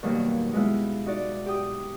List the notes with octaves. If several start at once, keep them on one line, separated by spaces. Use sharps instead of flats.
D#2 B2 F#3 G3 A#3
G#3 B3 E4 F4
D#4 F#4 D5
G4 G5 D#6